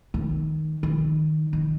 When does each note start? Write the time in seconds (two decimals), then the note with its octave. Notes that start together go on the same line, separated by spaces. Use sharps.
0.14 D#3
0.83 D#3
1.53 D#3